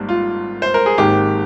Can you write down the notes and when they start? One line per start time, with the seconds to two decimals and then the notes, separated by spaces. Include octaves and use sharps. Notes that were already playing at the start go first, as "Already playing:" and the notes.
Already playing: G#1 G#2 G3 A#3
0.09 F4
0.62 C5
0.74 A#4
0.86 G#4
0.98 G#1 G#2 D#3 A#3 G4